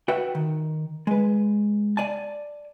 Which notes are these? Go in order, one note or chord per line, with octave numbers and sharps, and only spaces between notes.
F#4 B4 E5 G5
D#3
G#3 B4
D5 G#5 A5